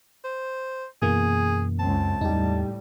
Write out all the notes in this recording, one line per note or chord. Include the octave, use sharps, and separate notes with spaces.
C5
F#2 B2 E3 A#3 G#4
C#2 C#3 C4 A5
E2 A2 G3 D#4 G4